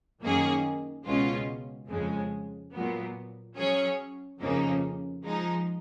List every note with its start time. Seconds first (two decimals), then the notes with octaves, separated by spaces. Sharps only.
0.22 F#2 D#3 A#3 C#4 G#4
1.05 C#2 B2 G#3 C#4 F4
1.88 F2 C#3 G#3
2.72 A#2 F#3 B3
3.56 F#3 C#4 G#4 C#5
4.40 F2 C#3 F3 A#3 D#4
5.23 F3 G#3 D#4